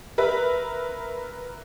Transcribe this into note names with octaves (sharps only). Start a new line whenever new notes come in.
A#4 B4 E5